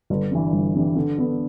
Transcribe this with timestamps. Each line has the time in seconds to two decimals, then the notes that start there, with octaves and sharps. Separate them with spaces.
0.10 G1
0.31 G2 E3
0.53 G1
0.75 G2 E3
0.96 D3
1.17 B3 D4 A4